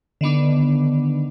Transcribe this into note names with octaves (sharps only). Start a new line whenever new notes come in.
D3 D#3 B3 D4